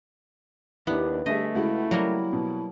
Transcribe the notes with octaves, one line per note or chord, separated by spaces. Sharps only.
D#2 A#3 B3 D4 E4 G4
D3 G3 A3 G#4 D#5 E5
C#2 G#3 E4 F#4
C#3 F#3 G3 A#3
B2